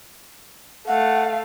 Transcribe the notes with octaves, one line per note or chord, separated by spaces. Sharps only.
A3 F5 F#5